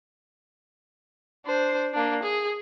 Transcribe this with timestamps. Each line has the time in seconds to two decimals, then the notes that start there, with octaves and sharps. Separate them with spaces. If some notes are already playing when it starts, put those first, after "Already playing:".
1.46 D4 C5
1.94 A#3 D4
2.23 G#4